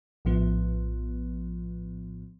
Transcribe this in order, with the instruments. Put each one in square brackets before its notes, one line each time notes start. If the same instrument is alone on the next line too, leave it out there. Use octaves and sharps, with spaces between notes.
[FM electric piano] A#1 A2 F3 B3